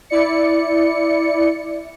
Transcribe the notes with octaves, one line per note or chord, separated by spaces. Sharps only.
E4 D5 C#7